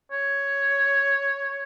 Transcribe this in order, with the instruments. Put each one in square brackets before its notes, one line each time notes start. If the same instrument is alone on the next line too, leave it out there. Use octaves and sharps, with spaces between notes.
[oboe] C#5